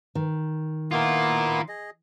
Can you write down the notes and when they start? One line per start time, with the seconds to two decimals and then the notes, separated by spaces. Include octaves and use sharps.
0.15 D#3
0.91 A#3 B3 E4 F4 A#4
1.68 G#4 D#5